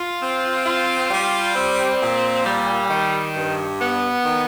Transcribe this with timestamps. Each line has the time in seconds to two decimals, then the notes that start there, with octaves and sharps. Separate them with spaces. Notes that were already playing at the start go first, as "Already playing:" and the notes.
Already playing: F4
0.22 C4
0.65 F4
1.11 G3
1.55 C4
2.01 A#2
2.45 G3
2.90 D#3
3.35 G2
3.80 B3
4.25 D#3